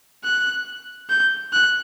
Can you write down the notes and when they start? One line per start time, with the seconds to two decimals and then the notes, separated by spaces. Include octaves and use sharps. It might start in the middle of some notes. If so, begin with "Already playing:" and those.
0.24 F#6
1.09 G6
1.52 F#6